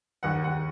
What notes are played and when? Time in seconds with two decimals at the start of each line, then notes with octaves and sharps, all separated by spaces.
0.23 D#2 F#5
0.44 D#2 F#5